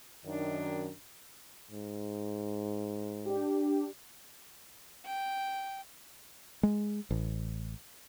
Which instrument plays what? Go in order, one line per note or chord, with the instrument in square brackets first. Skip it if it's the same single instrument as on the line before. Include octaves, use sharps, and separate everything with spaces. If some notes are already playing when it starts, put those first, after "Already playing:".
[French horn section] F#2 D#3 [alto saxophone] D4
[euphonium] G#2
[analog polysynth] D4 G4
[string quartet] G5
[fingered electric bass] G#3
A1